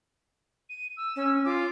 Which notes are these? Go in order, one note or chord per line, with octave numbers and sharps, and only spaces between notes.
D#7
E6
C#4
F4 D6